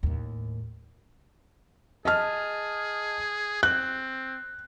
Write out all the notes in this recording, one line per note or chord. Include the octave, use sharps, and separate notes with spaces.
D#2 A2
G#4 D#5 A5 F6
C4 F#6